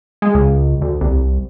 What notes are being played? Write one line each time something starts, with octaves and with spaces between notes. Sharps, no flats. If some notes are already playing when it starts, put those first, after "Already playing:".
G#3
C#2
D2
C2